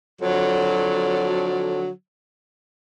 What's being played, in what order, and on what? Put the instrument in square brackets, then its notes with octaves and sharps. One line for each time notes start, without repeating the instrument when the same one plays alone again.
[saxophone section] F2 D3 F#3